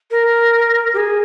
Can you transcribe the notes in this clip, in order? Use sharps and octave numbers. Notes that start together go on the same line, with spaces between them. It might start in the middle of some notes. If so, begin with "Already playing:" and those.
A#4
G4
G#4